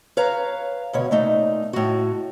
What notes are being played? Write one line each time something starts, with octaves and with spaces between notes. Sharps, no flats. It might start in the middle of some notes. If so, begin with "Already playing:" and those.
B4 C#5 F5 A#5
D2 B2 C#5
A#2 A3 D#4
A2 F#4